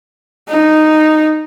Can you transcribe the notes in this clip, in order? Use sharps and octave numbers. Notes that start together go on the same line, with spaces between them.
D#4